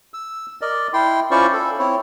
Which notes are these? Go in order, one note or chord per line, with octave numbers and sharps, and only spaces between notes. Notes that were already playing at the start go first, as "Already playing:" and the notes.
E6
A#4 D5 D#5
E4 G5 C6
C#4 E4 F4 C5 D5 C#6
A4
C4 E4 C#5